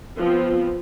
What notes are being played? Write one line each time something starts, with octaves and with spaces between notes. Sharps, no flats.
F3 B3 C4